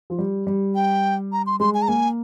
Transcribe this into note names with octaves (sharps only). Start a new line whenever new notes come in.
F3
G3
G3
G5
A#5
C6
G#3 C6
G#5
A#5
A#3 G#5